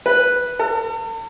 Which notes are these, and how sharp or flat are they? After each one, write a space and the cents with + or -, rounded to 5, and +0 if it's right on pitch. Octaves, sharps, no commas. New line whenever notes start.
B4 -5
A4 +45